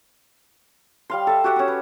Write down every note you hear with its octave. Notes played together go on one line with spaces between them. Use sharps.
G3 F5 C6
A4 E5
F#4 G4 E5 F#5
C#4 D#6
B4